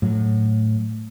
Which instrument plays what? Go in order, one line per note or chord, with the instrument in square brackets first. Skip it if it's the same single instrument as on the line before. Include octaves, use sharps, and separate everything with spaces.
[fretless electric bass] A2 F#3